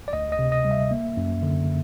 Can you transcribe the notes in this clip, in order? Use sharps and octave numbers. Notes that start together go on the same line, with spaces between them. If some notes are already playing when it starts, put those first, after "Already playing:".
D5
D2 D#5
D#5
C3
D#5
G3
E5
A#3
F#2
D3